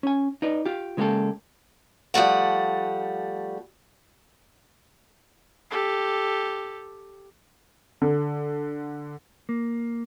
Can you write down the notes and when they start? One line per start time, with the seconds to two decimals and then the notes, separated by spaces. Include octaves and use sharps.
0.03 C#4 G#5
0.42 D#4 B4 D5
0.66 F4 G4
0.97 C#3 G#3 A#3 C#4 G4 A4
2.14 F3 G3 A3 F#5
5.71 G4 A4
8.02 D3
9.49 A#3